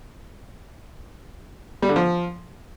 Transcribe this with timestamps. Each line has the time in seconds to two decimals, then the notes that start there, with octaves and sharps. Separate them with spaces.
1.82 G3
1.89 D3
1.96 F3